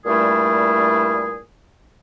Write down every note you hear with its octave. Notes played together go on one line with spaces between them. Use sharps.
G2 A#2 G3 A3 E4 G#4